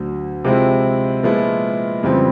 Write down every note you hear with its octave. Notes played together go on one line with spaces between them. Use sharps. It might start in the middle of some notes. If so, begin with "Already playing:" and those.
Already playing: D2 D3 F#3
C3 F3 G#3 C4 E4
A#2 F3 G#3 B3 E4
F2 C#3 E3 G3 C4